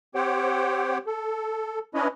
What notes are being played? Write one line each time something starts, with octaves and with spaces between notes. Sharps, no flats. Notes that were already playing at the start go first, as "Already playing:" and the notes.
C4 G4 C5 C#5 F#5 G5
A4
C#4 D4 E4 B4 C#5 D#5